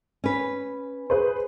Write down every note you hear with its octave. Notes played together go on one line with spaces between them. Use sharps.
C#4 B4
G#4 B4 C5